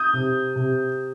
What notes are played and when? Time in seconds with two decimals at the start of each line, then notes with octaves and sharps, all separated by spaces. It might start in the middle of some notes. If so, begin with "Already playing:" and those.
Already playing: D#6 G6
0.13 C3
0.56 C3